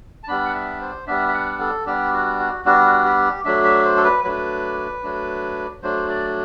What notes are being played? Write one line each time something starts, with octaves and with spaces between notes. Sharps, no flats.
A5
G3 B3 D4 B5
F#5
E5
C5
G3 B3 D4 E5
E5
F#5
A4
G3 B3 D4 G4
F#4
F#4
G3 B3 D4 F#4
F#4
G4
F#3 A3 D4 E5
E5
C5
A4
B4
F#3 A3 D4 B4
F#3 A3 D4
F#3 A3 D4 C5
D5